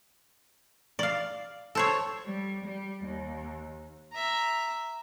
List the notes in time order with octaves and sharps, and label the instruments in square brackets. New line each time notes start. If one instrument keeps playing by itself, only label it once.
[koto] D5 F5
A4 C5 C#5
[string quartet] G3
G3
D#2
[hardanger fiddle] E5 A#5